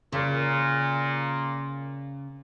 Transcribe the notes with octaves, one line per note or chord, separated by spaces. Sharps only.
A#2 C#3